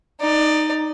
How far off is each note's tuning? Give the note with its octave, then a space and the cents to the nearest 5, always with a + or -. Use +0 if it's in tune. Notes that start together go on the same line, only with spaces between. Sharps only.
D#4 -5 D5 +15